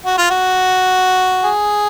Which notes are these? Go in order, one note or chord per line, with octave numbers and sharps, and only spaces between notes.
F#4
F4
F#4
G#4